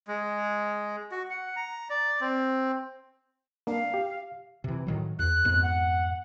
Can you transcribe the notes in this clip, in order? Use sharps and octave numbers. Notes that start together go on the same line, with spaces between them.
G#3
F#4
F#5
A#5
D5
C4
A#3 D4 F5
G4
C3 E3
A2 D#3 F#3
E2 F#6
F2 G#2 B3
F#5